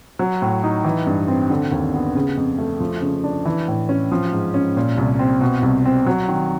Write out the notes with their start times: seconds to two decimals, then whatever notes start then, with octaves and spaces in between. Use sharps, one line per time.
0.19 F#3
0.42 A2
0.64 D#4
0.84 E3
1.07 G2
1.28 C4
1.50 D3
1.72 D#2
1.94 B3
2.15 C#3
2.37 F2
2.58 A3
2.80 F3
3.02 C#3
3.24 D4
3.45 E3
3.68 A2
3.89 C#4
4.12 F3
4.32 G#2
4.54 C#4
4.77 A#2
4.98 C2
5.19 C4
5.41 B2
5.63 C2
5.85 C4
6.07 F#3
6.28 D#3